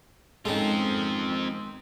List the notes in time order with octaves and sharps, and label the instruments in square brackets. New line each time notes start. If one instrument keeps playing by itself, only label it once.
[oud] G#2 C#4 A4 [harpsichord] D#3 G#3 [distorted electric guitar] C4 F4